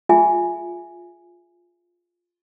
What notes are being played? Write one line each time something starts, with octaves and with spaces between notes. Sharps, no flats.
F4 G#4 E5 G#5